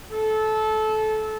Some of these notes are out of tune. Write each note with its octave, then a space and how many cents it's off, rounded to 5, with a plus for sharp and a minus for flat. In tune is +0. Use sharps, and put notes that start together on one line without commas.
A4 -20